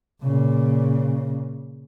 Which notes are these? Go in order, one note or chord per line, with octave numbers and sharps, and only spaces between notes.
A#2 C#3